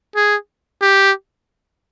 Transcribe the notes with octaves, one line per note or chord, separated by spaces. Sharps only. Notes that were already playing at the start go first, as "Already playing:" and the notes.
G#4
G4